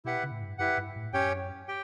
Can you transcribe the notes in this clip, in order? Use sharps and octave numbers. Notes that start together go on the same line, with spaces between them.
B2 E4 G4 B4 F#5
C#3
A2
G2
F#2 E4 G4 B4 F#5
G2
A2
F#2 C#4 G4 C#5 G5
G4 G5